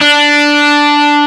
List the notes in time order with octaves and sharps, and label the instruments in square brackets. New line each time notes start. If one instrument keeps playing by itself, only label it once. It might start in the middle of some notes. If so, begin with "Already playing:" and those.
[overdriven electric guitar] D4